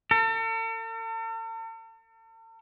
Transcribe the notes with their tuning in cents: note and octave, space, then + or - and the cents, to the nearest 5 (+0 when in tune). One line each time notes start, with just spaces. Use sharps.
A4 +45